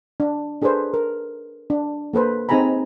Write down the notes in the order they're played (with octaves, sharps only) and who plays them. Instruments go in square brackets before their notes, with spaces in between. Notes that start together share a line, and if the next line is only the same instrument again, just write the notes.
[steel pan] D4
D4 G#4 A4 B4 C5
A#4
D4
A#3 A4 B4 C5
C4 D#4 G#4 G#5 A#5 B5